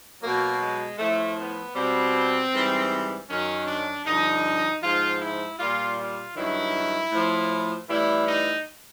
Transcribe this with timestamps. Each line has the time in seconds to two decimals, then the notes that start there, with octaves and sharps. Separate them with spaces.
0.22 B2 F#3 A#3
0.61 G#3
0.99 A2 F3 A3
1.38 B3
1.75 B2 G3 C4
2.53 G#2 E3 G3
3.29 F#2 D#3 F#3 C#4
3.67 D4
4.05 G2 D3 F3 D#4
4.81 G#2 F3 F4
5.20 E4
5.58 A#2 G3 F4
5.97 F4
6.35 G2 D#3 F#3 E4
7.12 A2 F3
7.88 A2 E3 G3 E4
8.27 D#4